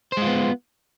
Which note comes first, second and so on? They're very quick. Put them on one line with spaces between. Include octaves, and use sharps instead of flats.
C5 G#3 F4 B3